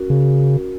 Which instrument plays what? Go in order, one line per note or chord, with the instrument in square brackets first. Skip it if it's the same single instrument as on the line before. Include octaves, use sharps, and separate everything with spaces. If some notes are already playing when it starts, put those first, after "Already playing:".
Already playing: [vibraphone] C#4 F#4 A#4
[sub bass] C#3